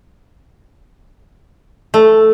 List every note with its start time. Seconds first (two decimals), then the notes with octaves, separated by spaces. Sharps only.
1.94 A3